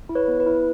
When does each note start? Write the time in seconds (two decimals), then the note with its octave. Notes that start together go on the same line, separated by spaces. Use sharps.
0.09 E4
0.15 B4 C#5
0.28 B3
0.40 B4
0.46 E4